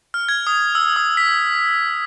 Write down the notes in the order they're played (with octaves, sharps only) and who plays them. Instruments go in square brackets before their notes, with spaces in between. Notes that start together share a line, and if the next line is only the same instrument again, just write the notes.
[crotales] F6
G#6
D#6
E6
D#6
B6